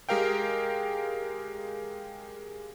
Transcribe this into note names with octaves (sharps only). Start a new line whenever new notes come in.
G#3 G4 A#4 F5 G5